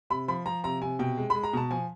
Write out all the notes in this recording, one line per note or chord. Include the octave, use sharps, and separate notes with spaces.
C3 B5
F3 B5
F3 A#5
C3 A#5
C3 G#5
B2 G5
G#3
G#3 B5
A#5
B2 A5
F3 G#5